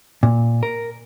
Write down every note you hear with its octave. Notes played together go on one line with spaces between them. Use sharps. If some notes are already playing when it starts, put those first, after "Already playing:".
A#2
A#4